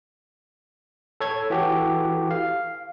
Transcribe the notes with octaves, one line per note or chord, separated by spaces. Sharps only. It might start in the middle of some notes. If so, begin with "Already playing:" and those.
A4 C#5 G#6
E3 F#4 G4 A4
F5